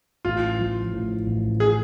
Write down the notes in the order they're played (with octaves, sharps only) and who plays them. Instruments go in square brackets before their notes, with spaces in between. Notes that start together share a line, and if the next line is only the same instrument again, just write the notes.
[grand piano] A1 [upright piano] F4
[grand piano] F3
A2
A1
[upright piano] G#4